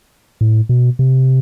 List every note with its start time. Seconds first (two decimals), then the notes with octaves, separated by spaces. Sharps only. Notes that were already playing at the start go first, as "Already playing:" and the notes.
0.41 A2
0.69 B2
0.99 C3